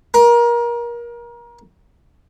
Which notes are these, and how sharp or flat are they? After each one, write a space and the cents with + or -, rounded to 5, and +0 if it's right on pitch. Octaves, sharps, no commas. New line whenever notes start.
A#4 +30